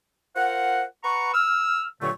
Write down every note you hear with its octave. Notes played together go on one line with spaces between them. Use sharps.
F4 A#4 C5 F#5
B4 F#5 A#5 C#6
E6 F6
G2 A#2 D3 F#3 A3 C#6